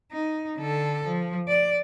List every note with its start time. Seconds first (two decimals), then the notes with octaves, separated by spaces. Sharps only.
0.12 D#4
0.58 D3 A4
1.07 F3
1.48 D5